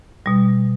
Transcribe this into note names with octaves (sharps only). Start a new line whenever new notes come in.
B2 G3